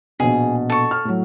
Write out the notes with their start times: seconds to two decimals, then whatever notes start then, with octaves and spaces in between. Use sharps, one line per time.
0.20 A#1 B2 G#4
0.70 A4 C#6
0.91 F6
1.05 A2 F#3